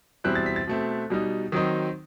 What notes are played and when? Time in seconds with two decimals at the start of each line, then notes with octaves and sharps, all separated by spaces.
0.24 E2 B2 G3 C4 E4 F#6
0.35 A6
0.46 B6
0.56 A6
0.67 B2 A3 C4
1.10 B2 G3 D#4
1.52 D#3 F#3 C4 D#4